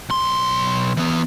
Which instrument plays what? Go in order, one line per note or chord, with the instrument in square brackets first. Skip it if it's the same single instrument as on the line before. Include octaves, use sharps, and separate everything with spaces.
[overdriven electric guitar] B1 C6
E3 B3